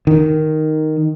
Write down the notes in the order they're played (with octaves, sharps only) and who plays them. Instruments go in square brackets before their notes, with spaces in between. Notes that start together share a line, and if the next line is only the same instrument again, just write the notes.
[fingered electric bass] D#3